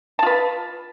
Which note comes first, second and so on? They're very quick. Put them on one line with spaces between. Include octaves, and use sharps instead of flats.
A5 F4 B4